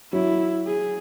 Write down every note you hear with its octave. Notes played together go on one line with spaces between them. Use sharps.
F#3 E4
G#4